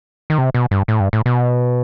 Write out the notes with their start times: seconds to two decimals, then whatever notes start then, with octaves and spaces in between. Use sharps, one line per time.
0.30 D#3
0.38 C3
0.54 B2
0.71 G2
0.88 A2
1.00 G2
1.13 A2
1.26 B2